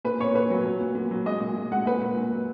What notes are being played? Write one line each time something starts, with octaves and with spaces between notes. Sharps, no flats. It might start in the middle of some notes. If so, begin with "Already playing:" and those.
A#2 B4
A#2 C#5
A#2 B4
F#3
F#3
A#2
A#2
F#3
G#3 D#5
A#2
G#3
G#3 F#5
A#2 B4
A#2
A#2
F#3